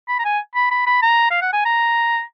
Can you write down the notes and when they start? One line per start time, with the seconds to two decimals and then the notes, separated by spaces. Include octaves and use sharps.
0.09 B5
0.19 A#5
0.25 G#5
0.55 B5
0.71 B5
0.87 B5
1.02 A#5
1.30 F5
1.42 F#5
1.53 G#5
1.65 A#5